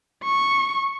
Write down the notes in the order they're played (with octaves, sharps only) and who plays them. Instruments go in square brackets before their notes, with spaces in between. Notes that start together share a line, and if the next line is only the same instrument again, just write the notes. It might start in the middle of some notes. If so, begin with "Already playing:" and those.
[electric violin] C#6